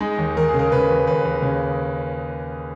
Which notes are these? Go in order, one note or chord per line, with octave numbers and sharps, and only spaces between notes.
G#3 D#4
D#2
D#2 A#4
G#4
C#3
A#4
C#3 B4
D#2
D#2 B4
D#2
C#3